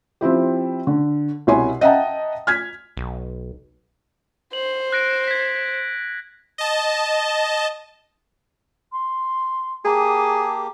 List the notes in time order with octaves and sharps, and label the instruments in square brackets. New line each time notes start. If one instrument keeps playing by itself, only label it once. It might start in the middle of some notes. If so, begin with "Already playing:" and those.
[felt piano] F3 C4 E4 G4
D3
C2 B2 E4 C#5 G#5 C6
D#5 E5 F#5 G5 A5 A#5
F6 G#6 B6
[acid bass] B1
[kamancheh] C5 [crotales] F#7
[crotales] F#6 A#6 D7
G#6 B6
[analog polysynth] D#5 A5
[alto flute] C6
[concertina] A#3 G4 [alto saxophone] G#4 [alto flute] A5